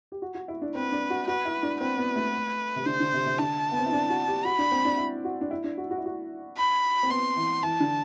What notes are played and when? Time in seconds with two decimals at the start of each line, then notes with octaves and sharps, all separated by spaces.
0.12 G4
0.22 F#4
0.35 F#4
0.48 E4
0.62 D4
0.75 C4 B4
0.92 D4
1.10 F#4
1.27 F#4 B4
1.45 E4
1.63 D4
1.81 C4 B4
1.98 B3
2.16 A3
2.76 C3
2.86 D3 C5
3.00 D3
3.13 C3
3.26 C3
3.39 D3 A5
3.72 B3
3.79 C4
3.86 E4
3.92 D4
4.10 F#4
4.28 G4
4.45 F#4 B5
4.59 D4
4.72 C4
4.85 D4
4.98 E4
5.24 F#4
5.41 D4
5.51 E4
5.64 D4
5.78 F#4
5.91 F#4
5.98 E4
6.06 F#4
6.57 B5
7.03 C4
7.10 B3 C6
7.36 E3
7.63 E3 A5
7.80 D3